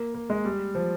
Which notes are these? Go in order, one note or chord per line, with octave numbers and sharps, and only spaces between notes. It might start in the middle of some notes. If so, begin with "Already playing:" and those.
Already playing: A#3
A#3
G#3
G3
F3